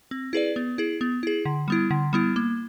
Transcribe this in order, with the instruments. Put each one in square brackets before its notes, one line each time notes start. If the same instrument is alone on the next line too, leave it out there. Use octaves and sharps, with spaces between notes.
[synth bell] C4
E4 G#4 B4 D5
B3
E4 G#4
B3
E4 G#4
D3
G3 B3 E4
D3
G3 B3 E4
A#3